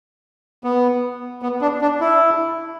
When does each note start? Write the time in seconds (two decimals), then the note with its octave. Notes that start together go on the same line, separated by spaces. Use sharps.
0.64 B3
1.42 B3
1.62 D4
1.81 D4
2.01 E4